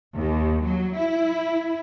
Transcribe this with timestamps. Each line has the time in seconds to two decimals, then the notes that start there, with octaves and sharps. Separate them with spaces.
0.15 D#2
0.63 F#3
0.95 E4